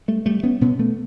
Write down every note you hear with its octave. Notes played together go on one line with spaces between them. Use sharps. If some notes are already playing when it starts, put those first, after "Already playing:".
G3 A3
G3 A3
B3 C#4
B2 B3 C#4
A3 B3